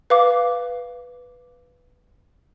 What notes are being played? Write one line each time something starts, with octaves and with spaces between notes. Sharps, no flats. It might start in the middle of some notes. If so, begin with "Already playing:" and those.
B4 F5 D6